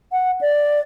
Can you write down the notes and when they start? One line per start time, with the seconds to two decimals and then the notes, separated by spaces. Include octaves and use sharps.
0.12 F#5
0.41 D5